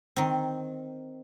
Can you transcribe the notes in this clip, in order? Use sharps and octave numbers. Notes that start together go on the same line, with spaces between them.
D#3 C4